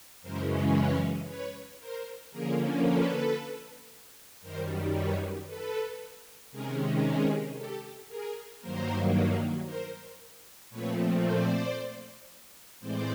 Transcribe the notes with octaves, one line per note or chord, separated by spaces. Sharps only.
F#2 C#3 E3 G#3 C#4 A#4 C5
B4 C#5
B4 C#5
A#4 C5
D3 F3 A#3 C#4 G#4 A#4
A4 B4
F#2 D#3 G3 A#4 C5
B4 C#5
A4 B4
C3 D#3 G#3 C#4 G#4 A#4
G#4 A#4
G4 A4
G#4 A#4
G2 D#3 F#3 A#3 A#4 C5
A#4 C5
A#2 F3 A3 C4 B4 C#5
C5 D5
A2 E3 G#3 C4 C5 D5